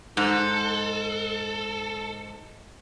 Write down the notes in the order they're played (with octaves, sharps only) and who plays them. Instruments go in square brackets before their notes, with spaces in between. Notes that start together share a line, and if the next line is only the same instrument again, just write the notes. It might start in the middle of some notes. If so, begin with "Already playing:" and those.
[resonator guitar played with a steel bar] G#2 [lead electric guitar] A4